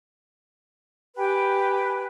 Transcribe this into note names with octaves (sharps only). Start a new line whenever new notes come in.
G4 B4 G5 G#5